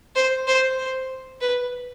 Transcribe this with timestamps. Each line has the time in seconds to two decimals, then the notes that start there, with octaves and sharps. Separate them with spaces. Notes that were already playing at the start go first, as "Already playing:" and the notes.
0.16 C5
0.47 C5
0.78 C5
1.41 B4